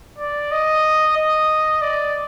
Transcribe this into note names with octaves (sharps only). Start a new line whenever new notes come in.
D5
D#5
D#5
D5